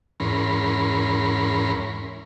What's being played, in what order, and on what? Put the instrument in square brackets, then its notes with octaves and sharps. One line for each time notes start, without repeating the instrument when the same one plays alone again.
[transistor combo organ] E2 G#2 C#4 A#4 B5 C6